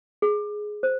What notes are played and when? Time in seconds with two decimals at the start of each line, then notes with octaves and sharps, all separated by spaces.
0.22 G#4
0.83 C5